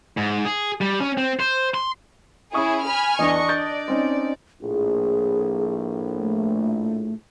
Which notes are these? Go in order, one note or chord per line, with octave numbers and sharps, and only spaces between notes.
G#2
G#4
G3
C#4
C4
C5
C6
C#4 E4 G#4 C#6 D#6
G#5 B5 F6
E2 E3 D4 D#5 C#6
D5 G6 A6
C4 C#4 D#4
A#1 A2 G#4
A3